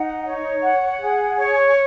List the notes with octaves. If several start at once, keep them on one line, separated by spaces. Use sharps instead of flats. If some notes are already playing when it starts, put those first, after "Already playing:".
Already playing: D#4 F#5
C#5
F#5
G#4
C#5